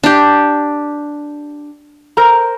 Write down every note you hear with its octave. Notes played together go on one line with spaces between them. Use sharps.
D4 G4
A#4 C5 A#5